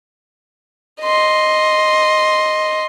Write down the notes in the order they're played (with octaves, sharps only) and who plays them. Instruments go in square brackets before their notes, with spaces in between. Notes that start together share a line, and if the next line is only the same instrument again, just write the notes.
[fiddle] D#5 C6